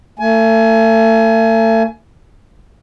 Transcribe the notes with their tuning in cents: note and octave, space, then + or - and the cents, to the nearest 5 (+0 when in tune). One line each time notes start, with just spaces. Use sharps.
A3 +35 G#5 +25